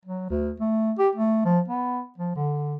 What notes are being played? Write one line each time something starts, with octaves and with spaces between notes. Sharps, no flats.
F#3
D2
A3
G4
A3
F3
B3
F3
D3